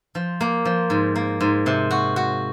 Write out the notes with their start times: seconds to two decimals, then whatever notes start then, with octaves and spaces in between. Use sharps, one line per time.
0.15 F3
0.41 A#3
0.65 F3
0.90 G#2
1.16 A#3
1.41 G#2
1.66 C3
1.91 F#4
2.16 F#4